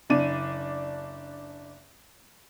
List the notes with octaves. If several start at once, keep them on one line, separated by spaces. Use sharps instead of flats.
F#1 D4 D#7